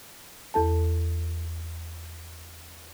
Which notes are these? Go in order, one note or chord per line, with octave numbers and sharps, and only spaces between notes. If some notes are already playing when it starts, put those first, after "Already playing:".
E2 A4 A5